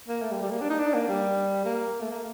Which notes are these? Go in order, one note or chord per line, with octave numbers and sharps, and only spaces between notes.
A#3
A3
G3
G3
A#3
D4
D#4
D4
A#3
G3
A#3
A3
A#3